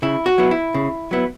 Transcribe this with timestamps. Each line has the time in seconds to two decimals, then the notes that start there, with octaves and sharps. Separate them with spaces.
0.02 C#3 E4
0.26 F#4
0.38 F#3 B3 E4
0.51 E4
0.74 C#3
1.11 F#3 B3 E4